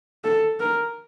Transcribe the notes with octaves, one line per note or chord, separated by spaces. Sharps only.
A4
A#4